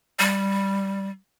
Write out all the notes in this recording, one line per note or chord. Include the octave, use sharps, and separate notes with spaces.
G3